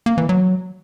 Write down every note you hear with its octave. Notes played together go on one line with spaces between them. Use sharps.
A#3
E3
F#3